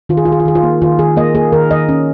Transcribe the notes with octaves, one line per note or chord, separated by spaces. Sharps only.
D#3 F4
G#4
F4
D#3 G#4
F4
D#3 G#4
F4
A#3
D#3 F4
D#3 G#4
A#3 D#5
A#3 G#4
D#3 A#4
D#3 D#5
C#4